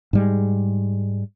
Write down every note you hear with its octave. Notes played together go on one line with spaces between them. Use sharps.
G#2 G3 G#3